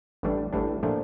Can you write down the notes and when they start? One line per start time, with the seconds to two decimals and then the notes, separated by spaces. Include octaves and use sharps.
0.23 A1 A2 E3 G3 D4
0.53 A1 A2 E3 G3 D4
0.83 A#2 F3 A3 D4